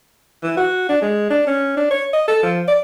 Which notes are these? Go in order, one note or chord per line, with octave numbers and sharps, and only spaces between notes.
E3
F#4
D4
G#3
D4
C#4
D4
C#5
D#5
A4
F3
D5